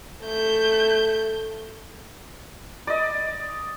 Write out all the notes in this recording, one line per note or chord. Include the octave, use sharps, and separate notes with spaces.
A3 G6
D5 D#5